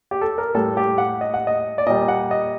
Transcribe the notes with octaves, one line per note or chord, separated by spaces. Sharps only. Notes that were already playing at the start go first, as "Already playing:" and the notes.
G4
A4
A#4
A2 G3 A4
G4
F#5
D#5
F#5
D#5
D5
A#2 G3 D#5
F#5
D#5